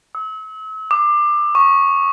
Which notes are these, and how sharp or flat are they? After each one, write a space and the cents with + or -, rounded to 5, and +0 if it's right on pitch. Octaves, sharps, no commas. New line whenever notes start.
E6 -40
D6 +25
C#6 -10